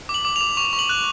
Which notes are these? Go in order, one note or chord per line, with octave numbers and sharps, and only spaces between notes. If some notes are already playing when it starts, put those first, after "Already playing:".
D6
F#7
D6
F7
D6
C#6 F7
C#6
F#7
F#6